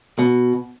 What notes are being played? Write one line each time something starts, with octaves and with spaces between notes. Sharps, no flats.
B2